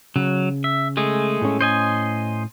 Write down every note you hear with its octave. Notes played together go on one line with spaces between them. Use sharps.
C#3 F#3
E5
G#3 A3 G#4
A2 C#4
C5 D#5 G#5